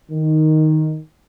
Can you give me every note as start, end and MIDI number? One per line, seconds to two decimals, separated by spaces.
0.11 0.97 51